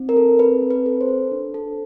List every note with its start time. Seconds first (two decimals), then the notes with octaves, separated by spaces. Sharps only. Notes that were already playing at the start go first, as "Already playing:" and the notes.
Already playing: C4 D#4
0.09 A#4
0.17 A4
0.39 C4 B4
0.62 C4
0.70 B4
0.86 A4
1.01 C5
1.09 A4
1.31 D4
1.54 A4